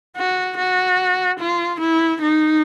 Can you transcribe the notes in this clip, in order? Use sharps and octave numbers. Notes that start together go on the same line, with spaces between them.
F#4
F#4
F4
E4
D#4